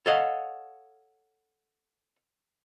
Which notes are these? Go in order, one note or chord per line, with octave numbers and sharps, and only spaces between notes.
A4 C#5 D#5 F5 F#5